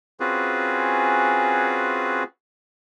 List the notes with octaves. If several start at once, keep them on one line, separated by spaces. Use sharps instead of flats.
C4 C#4 F4 F#4 G#4 B4